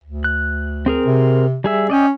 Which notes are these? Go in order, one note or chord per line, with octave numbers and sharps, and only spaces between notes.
D2
F#6
C4 G#4 A#4
C3
G3 G#4 E5
C#4 D5 D#5 G5